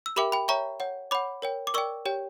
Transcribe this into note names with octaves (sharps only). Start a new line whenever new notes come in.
E6
G4 A#4 E5 G5 B5 D6
G5 B5
C#5 E5 G5 A#5 C#6
C#5 F#5
C#5 F#5 B5 D6
A#4 C#5 G5
D6
A#4 D5 G5 C#6 E6
G4 C#5 G5